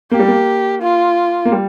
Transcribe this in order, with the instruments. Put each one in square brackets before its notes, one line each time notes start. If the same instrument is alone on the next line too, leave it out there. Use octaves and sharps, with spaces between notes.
[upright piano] A#3 [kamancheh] G4
[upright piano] G3
A#3
[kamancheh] F4
[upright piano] A#3
G3